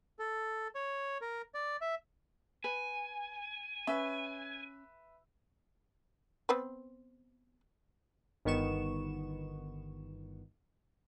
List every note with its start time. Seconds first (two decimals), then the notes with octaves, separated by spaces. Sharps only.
0.19 A4
0.75 C#5
1.21 A#4
1.55 D5
1.81 E5
2.64 B4 G#5
3.87 C#4 B4 E5
6.49 B3 C4 B4
8.45 G1 D#3 B3 C#6 E7